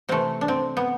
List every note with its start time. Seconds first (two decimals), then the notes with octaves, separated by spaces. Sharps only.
0.09 C3 E3 A3 C4
0.41 D4
0.48 C4
0.77 B3